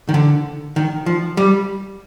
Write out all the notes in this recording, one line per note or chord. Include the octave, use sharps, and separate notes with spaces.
D#3
D3
D#3
F3
G3